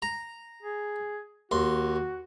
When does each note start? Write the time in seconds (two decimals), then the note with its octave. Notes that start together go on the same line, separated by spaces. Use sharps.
0.02 A#5
0.62 G#4
1.51 D#2 F#4 C6